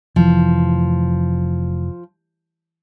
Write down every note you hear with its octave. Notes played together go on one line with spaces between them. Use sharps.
F1 E3 F3